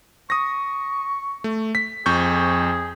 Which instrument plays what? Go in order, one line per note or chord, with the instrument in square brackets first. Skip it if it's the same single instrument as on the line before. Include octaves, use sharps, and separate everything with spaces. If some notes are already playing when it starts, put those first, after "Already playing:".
[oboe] C#6 [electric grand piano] D#6 A#6
[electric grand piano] A3
B6
[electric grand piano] F2 C#6 G6 [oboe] G#4